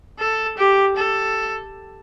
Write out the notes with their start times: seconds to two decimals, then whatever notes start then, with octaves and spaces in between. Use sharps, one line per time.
0.19 A4
0.58 G4
0.96 A4